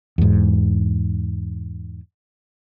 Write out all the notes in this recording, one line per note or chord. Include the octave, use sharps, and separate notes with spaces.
E2 G#2